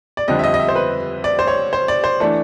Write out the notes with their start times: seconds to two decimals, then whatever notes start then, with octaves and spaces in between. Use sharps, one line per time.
0.17 D5
0.28 F2 D3 G3 C4 D#5
0.39 E5
0.44 D#5
0.54 D#5
0.60 E5
0.68 C5
0.75 B4
1.24 D5
1.39 C5
1.47 C#5
1.73 C5
1.88 D5
2.04 C5
2.20 E3 A3 D4